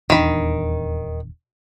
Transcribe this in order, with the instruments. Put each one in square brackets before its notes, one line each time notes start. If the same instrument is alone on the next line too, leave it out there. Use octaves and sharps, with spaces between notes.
[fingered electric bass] D#1 E2 D4 [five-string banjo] D#3 B5